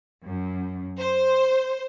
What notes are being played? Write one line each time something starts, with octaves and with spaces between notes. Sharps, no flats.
F#2
C5